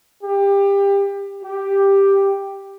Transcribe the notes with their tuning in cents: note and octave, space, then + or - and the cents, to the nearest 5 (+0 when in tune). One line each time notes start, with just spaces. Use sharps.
G4 +25
G4 +5